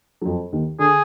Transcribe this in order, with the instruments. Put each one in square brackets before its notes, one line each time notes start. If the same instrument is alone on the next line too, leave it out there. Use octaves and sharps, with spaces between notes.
[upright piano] F#3
F2 F3
D#2 D#3
[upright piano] D3 [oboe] G#4